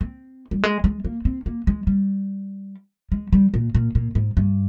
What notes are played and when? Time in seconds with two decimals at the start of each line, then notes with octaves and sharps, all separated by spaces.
0.01 C4
0.51 G3
0.63 G#3
0.84 G#3
1.05 A#3
1.25 C4
1.46 A#3
1.67 G#3
1.87 G3
3.12 G#3
3.33 G3
3.54 A#2
3.75 A#2
3.95 A#2
4.15 G#2
4.37 G2